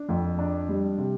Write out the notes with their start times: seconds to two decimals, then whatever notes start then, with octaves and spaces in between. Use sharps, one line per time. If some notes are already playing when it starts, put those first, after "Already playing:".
Already playing: D4
0.09 F2
0.39 D4
0.69 G3
0.98 C3